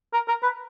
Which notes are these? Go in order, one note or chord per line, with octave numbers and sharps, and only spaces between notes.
A#4
A#4
B4